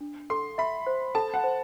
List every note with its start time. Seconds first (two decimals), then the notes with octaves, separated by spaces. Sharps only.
0.01 D4
0.30 A4 C6
0.58 E5 B5
0.87 C5
1.15 A4 A5
1.34 F#5
1.44 C5